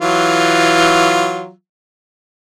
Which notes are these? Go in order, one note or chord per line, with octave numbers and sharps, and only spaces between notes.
E3 F#3 F4